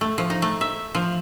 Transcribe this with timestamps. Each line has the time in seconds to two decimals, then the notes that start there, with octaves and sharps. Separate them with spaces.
0.01 A3
0.18 F3
0.30 D#4
0.42 A3
0.61 E5
0.95 F3